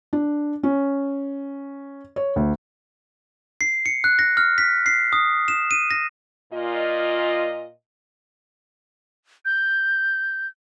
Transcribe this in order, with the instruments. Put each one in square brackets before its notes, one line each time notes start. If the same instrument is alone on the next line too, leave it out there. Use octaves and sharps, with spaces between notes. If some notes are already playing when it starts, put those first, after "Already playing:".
[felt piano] D4
C#4
C#5
D2
[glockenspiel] C7
C#7
F#6
A#6
F6
B6
C7
D#6
E7
D#7
A#6
[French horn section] A#2 F4 D#5
[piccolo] G6